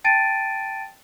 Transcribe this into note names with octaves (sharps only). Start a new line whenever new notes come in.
G5 A5 A6 D7 D#7